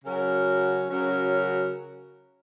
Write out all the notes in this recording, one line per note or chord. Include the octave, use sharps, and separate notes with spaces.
C#3 F#3 C#4 F#4 A#4
C#3 F#3 C#4 F#4 A#4